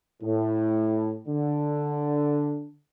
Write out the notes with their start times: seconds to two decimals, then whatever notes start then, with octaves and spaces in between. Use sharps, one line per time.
0.23 A2
1.28 D3